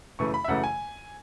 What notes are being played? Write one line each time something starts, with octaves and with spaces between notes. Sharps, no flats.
F#2 C#3 E3 A3 C#6
B5
E5
F#2 C#3 E3 A3 F#5
G#5